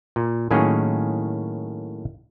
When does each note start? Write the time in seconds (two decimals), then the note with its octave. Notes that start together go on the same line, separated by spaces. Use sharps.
0.16 A#2
0.51 A2 D#3 F#3 A#3 C#4 G#4